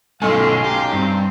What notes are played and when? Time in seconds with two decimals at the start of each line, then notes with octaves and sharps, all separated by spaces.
0.22 B1 B2 A3 C#4 A4 F5 G#5 C6
0.64 G4 A#5
0.93 G2 C4